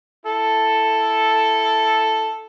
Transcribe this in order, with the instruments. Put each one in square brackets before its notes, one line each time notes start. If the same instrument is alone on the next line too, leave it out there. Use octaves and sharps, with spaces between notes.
[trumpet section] E4 A4